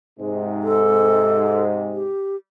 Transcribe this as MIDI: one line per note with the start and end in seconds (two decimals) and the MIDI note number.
0.19 2.09 44
0.19 2.09 48
0.19 2.09 56
0.64 1.63 69
1.92 2.36 67